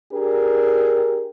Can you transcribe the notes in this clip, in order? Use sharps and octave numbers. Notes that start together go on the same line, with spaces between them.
D4 G4 G#4 A#4